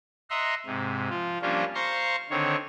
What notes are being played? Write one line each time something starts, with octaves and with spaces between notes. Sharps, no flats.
D#5 E5 F#5 A#5 C6
G#2 C3
F3 F4
F3 G3 A#3 C#4 D4 F4
C5 F5 A#5 C6 C#6
D3 D#3 C4 C#5